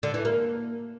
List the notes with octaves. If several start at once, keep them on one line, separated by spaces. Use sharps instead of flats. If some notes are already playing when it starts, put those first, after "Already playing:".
D3
E3
A#3